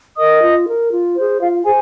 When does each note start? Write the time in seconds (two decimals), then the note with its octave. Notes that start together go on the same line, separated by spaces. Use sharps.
0.17 A#4 D#5 D#6
0.42 F4
0.67 A#4
0.91 F4
1.16 G#4 C5
1.40 F4 F5
1.65 G#4 C5 G#5